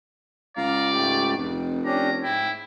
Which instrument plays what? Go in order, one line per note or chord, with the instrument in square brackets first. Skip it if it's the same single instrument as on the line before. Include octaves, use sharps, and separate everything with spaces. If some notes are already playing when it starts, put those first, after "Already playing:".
[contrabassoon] C#2 [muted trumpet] D5 [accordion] F5 A#5
[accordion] G#2 A3 G4
[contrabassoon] F1 [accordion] F2
[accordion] C#4 D4 G4 [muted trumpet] A#5
[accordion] G#2 G5 [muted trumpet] E4